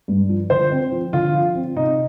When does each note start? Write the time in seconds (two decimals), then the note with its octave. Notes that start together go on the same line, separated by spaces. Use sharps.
0.08 G2
0.29 F3
0.50 D3 C5
0.71 C4
0.92 F3
1.13 D3 F4
1.34 F3
1.55 C4
1.76 C3 D#4